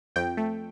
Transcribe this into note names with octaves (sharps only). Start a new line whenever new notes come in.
F2 G5
A3